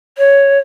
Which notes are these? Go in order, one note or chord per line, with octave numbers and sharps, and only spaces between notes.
C#5